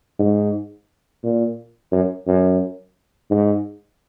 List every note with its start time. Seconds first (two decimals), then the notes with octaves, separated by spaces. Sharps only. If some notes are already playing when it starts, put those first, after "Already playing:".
0.19 G#2
1.24 A#2
1.92 F#2
2.27 F#2
3.31 G#2